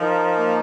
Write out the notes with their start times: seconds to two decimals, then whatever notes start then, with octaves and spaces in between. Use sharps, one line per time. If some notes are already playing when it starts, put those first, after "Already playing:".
Already playing: F3 D#4 A#4
0.37 A#3